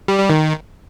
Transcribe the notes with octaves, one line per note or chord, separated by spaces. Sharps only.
G3
G3
D#3